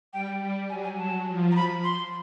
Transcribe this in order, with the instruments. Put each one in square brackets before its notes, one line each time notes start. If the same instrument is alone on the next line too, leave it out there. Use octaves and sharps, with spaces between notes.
[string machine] G3 [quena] G5
[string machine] G3
[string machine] F#3 [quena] G#5
[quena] G#5
[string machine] F#3 [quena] A5
[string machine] F3
[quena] A#5
B5
C6